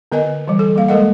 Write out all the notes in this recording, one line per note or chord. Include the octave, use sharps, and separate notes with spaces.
D3 B3 A#4 D#5 G#5
E3 G3
A4
G3 A#3 F5
G#3 A#3 A4 A#4 D#5 F#5